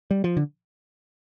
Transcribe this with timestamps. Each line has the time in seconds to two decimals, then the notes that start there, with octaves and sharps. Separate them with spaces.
0.11 G3
0.24 F3
0.37 D3